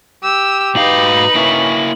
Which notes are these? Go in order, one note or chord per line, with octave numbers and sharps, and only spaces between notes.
G4 E6
G#2 D#4 F#4 B4 F5 F#7
A#3 C#4 E4